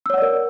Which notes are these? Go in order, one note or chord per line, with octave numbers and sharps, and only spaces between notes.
A#4 C#5 D5 F#5 E6